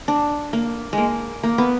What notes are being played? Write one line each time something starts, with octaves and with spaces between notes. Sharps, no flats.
D4
A#3
G#3 A#3
A#3
B3